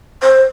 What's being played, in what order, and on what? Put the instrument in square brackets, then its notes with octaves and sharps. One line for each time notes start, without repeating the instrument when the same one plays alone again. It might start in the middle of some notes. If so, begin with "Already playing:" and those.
[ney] C5